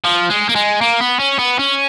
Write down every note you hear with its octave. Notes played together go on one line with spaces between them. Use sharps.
F3
G#3
A#3
G#3
A#3
B3
C#4
B3
C#4